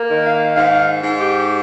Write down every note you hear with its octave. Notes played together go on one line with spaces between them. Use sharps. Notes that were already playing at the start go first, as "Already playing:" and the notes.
Already playing: A#3
D#3
F5
G#2 F5
G#2
G4